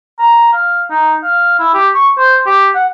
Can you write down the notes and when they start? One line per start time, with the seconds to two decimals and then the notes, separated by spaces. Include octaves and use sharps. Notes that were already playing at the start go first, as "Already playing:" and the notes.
0.19 A#5
0.53 F5
0.90 D#4
1.24 F5
1.59 E4
1.74 G4
1.94 C#6
2.18 C5
2.46 G4
2.75 F#5